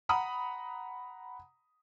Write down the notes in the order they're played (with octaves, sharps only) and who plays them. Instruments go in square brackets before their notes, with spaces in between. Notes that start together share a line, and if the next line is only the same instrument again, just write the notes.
[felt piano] F#5 A#5 B5 D#6